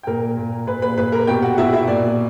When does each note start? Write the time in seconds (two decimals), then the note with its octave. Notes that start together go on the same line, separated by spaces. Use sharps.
0.03 G5
0.07 A#2 A#4 A#5
0.37 A#2
0.67 A#2 B4 B5
0.82 B4 B5
0.97 A#2 B4 B5
1.12 A#4 A#5
1.27 B2 G4 G5
1.42 F#4 F#5
1.58 B2 E4 E5
1.73 E4 E5
1.87 A#2 D5